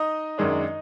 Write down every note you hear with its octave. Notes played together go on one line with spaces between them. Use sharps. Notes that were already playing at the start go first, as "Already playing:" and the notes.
Already playing: D#4 D#5
F#2 D#3 G#3 D4